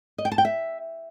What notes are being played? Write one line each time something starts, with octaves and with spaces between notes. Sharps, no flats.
D#5
G5
A5
G5
E5